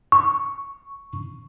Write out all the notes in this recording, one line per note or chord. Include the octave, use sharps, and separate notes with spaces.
C#6